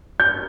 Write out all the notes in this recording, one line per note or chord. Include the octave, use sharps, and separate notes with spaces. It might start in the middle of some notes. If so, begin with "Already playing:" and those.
G6